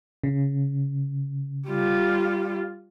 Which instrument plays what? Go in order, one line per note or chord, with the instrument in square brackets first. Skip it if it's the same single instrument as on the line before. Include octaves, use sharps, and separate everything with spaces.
[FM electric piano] C#3
[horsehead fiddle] G3 F4